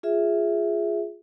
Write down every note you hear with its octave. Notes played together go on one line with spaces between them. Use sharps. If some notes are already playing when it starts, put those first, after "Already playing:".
F4 G#4 E5